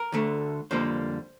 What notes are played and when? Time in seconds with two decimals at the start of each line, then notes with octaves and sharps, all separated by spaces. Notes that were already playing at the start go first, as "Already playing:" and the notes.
Already playing: A#4
0.12 D2 D3 A3
0.71 F2 D3 G3 A#3 C5